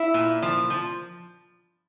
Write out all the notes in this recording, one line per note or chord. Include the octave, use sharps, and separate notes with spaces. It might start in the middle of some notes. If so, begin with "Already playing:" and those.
Already playing: E4
A#2
F3
F3